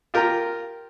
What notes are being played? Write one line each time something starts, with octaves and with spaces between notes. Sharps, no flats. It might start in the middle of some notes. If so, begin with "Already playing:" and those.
F4 G4 A#4 G5